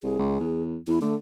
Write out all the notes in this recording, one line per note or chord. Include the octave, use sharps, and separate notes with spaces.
C2 G#4
C#2
E2
E2 E4
D3 A3